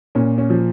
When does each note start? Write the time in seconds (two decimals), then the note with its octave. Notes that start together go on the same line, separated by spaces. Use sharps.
0.15 A#2 C#4
0.38 C#4
0.50 F3